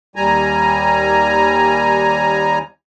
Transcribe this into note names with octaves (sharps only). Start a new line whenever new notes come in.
D#2 G3 G#5 A#5